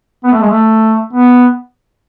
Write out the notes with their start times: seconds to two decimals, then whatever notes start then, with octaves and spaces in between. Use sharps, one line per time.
0.24 B3
0.32 A3
0.41 G#3
0.50 A3
1.13 B3